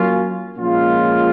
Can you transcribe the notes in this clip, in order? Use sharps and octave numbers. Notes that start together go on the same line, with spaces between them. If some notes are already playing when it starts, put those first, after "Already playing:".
Already playing: F#3 A#3 C#4 F4
A#2 F3 G#3 C#4 F4